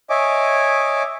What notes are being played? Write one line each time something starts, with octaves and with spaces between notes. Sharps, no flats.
C#5 D#5 E5 G#5 D6